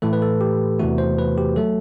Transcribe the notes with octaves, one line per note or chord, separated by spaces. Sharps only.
A2 E3 A3 A4
B4
A4
G4
E2 C3 E3 A3 F#4
C5
B4
G4
F#3 A3 A4